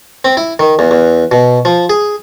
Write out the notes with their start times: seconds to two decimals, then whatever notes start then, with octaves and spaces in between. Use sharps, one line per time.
0.25 C4
0.37 E4
0.59 D#3
0.79 E2
0.91 E2
1.31 B2
1.65 F3
1.90 G#4